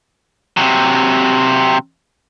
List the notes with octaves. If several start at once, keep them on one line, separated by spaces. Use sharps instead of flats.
C3 F#3